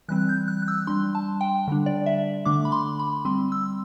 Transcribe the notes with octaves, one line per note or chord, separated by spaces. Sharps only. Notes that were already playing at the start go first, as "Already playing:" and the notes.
E3 G3 C4 F#6
G6
F#6
F#6
E6
G3 D4 C6
A5
G5
D3 G3 D4
D5
E5
D3 A3 D4 D6
B5
C6
B5
G3 C4 C6
E6